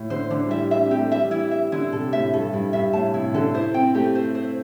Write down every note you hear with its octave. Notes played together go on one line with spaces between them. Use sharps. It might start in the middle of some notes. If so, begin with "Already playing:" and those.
Already playing: A2
D3 C5
D3 D4
G3
E3 E5
D4 E5
C4
G4
A3
G3 E5
E3 E4
E5
D3 E4
C3 A4
A2 E5
G2 A4
G2 E4
G2 E5
A2 A5
C3 E4
D3 A4
E4 C5
C4 G5
A3 G4
C5
C5